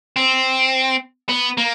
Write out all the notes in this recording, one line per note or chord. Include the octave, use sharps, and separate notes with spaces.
C4
B3
A#3